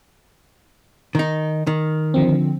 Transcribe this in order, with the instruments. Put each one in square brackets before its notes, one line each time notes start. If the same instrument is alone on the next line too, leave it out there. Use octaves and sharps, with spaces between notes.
[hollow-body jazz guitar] D#3 D#4
D#3
[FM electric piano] D3 F3 C4